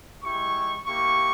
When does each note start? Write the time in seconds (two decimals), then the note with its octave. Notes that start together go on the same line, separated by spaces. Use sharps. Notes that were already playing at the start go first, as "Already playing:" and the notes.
0.23 G#3 E4 G4 C#6
0.86 A#3 E4 G4 C#6